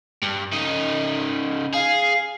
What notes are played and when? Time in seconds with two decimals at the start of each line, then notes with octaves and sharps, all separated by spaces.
0.22 G2
0.53 C#3 D#4
1.74 G#4 F5